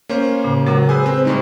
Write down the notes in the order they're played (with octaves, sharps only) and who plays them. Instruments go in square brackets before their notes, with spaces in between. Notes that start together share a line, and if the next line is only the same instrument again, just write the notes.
[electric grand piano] A#3 C#4 C5 [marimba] C#5
[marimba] A2 C#3
[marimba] C#3 G#3 [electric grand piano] F#3 [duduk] A#4
[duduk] G#4 [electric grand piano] B4 C5 G#5 [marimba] E6
[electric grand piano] C4 [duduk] C5
[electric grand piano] A2 G3 G#3 [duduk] D#4